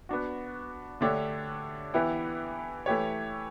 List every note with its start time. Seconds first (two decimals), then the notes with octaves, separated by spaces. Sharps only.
0.09 B3 D4 F#4
1.01 D3 A3 D4 G4 C#5
1.94 E3 B3 E4 G4
2.86 E3 A3 E4 G4 C#5